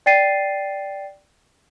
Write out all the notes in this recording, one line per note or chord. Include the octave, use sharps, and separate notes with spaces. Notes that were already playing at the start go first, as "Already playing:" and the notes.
D5 G5 A6 C7 D#7